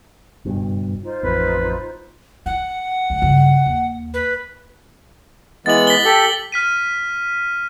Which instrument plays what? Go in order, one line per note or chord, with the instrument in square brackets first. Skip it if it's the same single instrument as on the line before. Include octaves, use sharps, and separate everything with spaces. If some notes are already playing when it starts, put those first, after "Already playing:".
[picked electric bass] F#1 G2 B2
[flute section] D#4 F4 C5
[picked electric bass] A1 F2 [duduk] B4
[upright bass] E4 [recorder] F#5
[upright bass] C#2 E3
G2 C#3
D#2
[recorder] B4
[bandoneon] E3 G#3 B3 [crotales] A6 F#7
[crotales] B6 G7
[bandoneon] G4 A4
[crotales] F6 B6 D#7